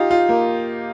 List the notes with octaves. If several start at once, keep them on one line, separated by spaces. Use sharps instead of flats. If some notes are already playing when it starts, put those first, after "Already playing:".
Already playing: D#4 F4 G4
F4
A#3